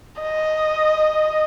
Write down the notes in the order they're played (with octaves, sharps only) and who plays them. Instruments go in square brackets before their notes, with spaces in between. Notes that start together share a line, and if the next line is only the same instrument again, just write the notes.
[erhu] D#5